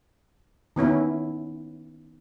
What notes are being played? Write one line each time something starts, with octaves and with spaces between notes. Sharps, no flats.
D#3 B3 C#4 E4